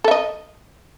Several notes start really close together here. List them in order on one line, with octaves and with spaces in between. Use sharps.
A4 E5 D#5